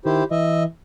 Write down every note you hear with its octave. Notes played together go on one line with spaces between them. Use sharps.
D#3 E4 G4 C5
E3 D#5 E5